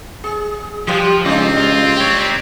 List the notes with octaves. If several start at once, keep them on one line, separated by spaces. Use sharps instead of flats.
G#4
F3 F#3 F4 G4
C#2 G3 C4 D4
F4
G4 C#5